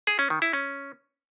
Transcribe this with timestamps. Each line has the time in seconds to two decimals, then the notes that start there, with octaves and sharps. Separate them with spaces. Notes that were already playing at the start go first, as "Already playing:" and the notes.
0.07 G#4
0.19 C#4
0.30 D#3
0.42 E4
0.53 C#4